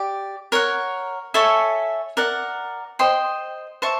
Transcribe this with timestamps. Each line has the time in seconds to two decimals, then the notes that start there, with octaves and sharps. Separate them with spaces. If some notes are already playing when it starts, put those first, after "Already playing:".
Already playing: G4 D5
0.52 A#4 C#5 F#5
1.34 A4 C#5 E5 G#5
2.17 A#4 D5 F#5
2.99 C5 D#5 G5 C6
3.82 C5 E5 A5 C#6